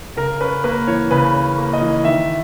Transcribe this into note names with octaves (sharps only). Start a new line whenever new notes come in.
C#3 A#4
C#4 B4
A#3 B4
E3 C#5
C#3 B4
C#4
A#3
D#5
E3
D#3 E5